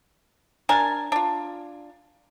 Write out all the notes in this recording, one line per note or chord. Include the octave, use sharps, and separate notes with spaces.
D4 A#4 G#5 A5
D4 F4